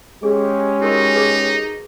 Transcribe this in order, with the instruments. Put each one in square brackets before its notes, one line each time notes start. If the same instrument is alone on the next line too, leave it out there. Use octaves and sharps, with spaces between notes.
[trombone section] G#3 C#4 G4 [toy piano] G#4
[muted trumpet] D#4 [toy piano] F#4 A#4 C#6
[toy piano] G#4 B4 D6